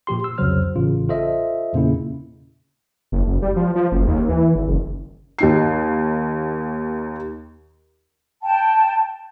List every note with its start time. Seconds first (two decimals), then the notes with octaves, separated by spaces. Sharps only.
0.07 A#2 F3 G4 C6
0.24 E6
0.38 C2 F2 C#3 F#3 C5 F6
0.76 A1 C#3 F4
1.09 F4 A4 C5 D#5 E5
1.73 E2 A#2 C#3 A#3 C#4 E4
3.12 F#1
3.28 F#1
3.42 G3
3.56 F3
3.75 F3
3.92 F#1
4.07 D#2
4.29 E3
4.56 G#1
4.68 F#1
5.39 D#2 D#4 C7
8.42 G5 A5